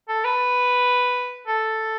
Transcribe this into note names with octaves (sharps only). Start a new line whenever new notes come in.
A4
B4
A4